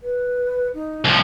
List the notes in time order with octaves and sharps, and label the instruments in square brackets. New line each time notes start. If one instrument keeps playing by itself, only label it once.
[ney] B4
D#4
[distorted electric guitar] C2 F3